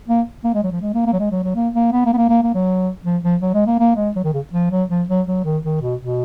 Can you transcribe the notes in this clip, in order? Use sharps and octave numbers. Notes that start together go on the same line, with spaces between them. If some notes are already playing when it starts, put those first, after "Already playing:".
A#3
A#3
G#3
F#3
F3
G#3
A#3
A#3
F#3
G#3
F#3
F#3
A#3
A#3
B3
A#3
B3
A#3
A#3
A#3
F#3
F3
F3
F#3
G#3
A#3
A#3
G#3
F#3
D#3
C#3
F3
F#3
F3
F#3
F#3
D#3
D#3
B2
B2